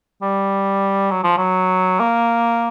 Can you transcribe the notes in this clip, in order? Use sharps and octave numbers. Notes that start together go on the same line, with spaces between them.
G3
F#3
F3
F#3
A#3